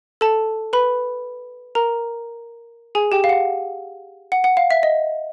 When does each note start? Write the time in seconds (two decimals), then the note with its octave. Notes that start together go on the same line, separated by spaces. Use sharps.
0.21 A4 A5
0.73 B4 B5
1.75 A#4 A#5
2.95 G#4 G#5
3.12 G4 G5
3.24 F5
3.29 F#5
4.32 F#5
4.44 F#5
4.57 F5
4.71 E5
4.83 D#5